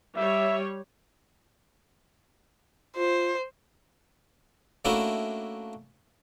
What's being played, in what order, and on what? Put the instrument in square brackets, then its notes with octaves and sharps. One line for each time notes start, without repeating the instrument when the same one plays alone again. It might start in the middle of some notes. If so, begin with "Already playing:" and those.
[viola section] G3 C#5 [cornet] E5
[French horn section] F4 [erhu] C5
[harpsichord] A3 A#3 C#4 D4 E4 F#4